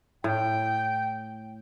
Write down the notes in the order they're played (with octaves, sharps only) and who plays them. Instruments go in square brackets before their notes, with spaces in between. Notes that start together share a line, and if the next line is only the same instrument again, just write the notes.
[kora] A2 [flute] G5